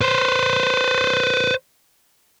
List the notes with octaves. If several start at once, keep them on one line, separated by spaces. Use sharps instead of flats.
B4 C5